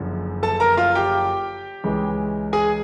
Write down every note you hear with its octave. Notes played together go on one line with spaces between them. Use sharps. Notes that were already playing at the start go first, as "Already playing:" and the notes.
Already playing: F#1 F#2 D3 F3
A4 A5
A#4 A#5
F4 F5
G4 G5
C#2 C#3 E3 G#3
G#4 G#5